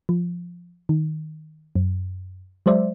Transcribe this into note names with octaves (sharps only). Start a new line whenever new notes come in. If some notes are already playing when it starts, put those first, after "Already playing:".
F3
D#3
F#2
F#3 G#3 C5 D5 E5